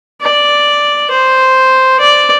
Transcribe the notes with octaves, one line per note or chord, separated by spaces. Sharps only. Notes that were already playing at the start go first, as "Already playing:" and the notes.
D5
C5
D5